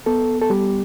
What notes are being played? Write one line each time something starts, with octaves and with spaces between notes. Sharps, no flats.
B3 A4
A4
G3 G4